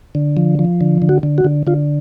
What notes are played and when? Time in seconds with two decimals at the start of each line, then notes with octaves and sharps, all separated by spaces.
0.15 D3
0.37 F3
0.59 F3
0.81 D3
1.02 D3
1.09 F#4
1.23 D3
1.38 F#4
1.45 D3
1.67 D3 F4